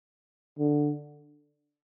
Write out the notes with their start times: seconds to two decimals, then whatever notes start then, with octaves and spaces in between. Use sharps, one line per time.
0.59 D3